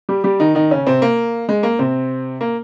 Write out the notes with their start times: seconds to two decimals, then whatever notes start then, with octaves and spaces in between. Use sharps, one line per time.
0.09 G3 G4
0.24 G3 G4
0.40 D#3 D#4
0.55 D#3 D#4
0.71 C#3 C#4
0.87 C3 C4
1.02 A#3
1.49 G#3
1.63 A#3
1.79 C3 C4
2.41 A#3